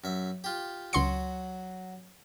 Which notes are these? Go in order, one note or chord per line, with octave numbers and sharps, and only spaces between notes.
F#2 E5
F4 G4
C#2 F#3 F#4 C6 C#7